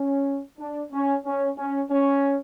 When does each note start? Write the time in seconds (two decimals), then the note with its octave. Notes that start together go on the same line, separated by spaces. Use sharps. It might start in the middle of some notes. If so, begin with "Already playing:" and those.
Already playing: C#4
0.59 D4
0.92 C#4
1.25 C#4
1.58 C#4
1.90 C#4